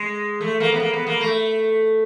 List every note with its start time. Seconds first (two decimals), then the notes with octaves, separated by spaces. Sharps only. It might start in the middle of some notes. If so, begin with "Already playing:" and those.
Already playing: G#3
0.41 A3
0.60 A#3
0.72 B3
0.80 A#3
0.94 B3
1.07 A#3
1.20 A3